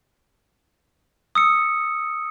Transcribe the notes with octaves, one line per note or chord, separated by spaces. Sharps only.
D#6 E6 C#7